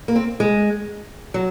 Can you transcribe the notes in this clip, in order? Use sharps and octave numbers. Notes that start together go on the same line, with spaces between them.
A#3
C4
G#3
F#3